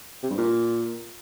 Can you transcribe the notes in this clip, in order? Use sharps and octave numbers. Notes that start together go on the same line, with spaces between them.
C3
G2
A#2